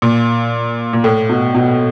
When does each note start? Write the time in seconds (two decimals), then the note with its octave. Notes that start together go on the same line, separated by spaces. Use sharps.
0.02 A#2
0.93 A#2
1.04 A2
1.29 B2
1.54 B2